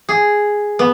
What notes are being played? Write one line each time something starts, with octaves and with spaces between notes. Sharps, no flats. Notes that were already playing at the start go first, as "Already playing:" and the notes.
G#4
B3